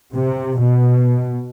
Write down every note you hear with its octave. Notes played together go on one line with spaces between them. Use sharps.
C3
B2